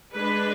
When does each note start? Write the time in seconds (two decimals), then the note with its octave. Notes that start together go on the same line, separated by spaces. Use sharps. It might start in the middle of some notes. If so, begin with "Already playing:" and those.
0.15 G#3 D4 B4